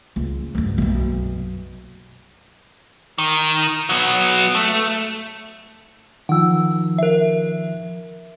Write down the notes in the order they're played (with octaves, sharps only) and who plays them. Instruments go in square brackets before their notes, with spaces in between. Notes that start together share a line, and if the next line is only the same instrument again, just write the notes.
[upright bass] C#2
D2 G2
B1 F#2
[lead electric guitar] D#3
F#3 B3
A3
[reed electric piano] D#3 F3 [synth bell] F#5 E6
[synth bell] A#4 E5